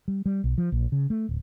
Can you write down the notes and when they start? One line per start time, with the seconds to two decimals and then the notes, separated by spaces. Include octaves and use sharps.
0.08 G3
0.26 G3
0.44 B1
0.58 F3
0.72 A#1
0.92 C#3
1.10 A3
1.29 D1